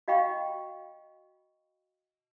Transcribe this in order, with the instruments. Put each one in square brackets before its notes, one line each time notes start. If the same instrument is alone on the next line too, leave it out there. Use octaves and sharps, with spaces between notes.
[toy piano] F#4 D#5 F5 G5 B5 C#6